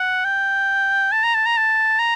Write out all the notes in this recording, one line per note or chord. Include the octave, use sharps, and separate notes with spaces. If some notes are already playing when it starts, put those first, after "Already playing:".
Already playing: F#5
G5
A5
A#5
A5
A#5
A5
A#5